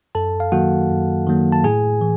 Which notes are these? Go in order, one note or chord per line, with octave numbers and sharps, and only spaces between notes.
F#2 A4 A5
F5
D#3 F#3 A#3 F#4 F#5
F#2
D#3 F#3 A#3
A5
A2 G#4 G#5
E3